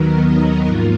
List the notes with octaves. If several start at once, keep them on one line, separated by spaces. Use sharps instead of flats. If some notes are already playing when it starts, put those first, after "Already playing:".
Already playing: D#2 D#3 F#3 B3 A#4
D#4
G#2 F3 A#3 F4